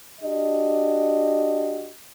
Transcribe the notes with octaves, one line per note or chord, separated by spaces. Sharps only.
D4 F#4 G4 D#5